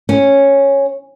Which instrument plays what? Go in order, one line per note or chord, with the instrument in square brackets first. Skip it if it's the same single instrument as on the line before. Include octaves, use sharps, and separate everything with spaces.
[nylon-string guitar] C#4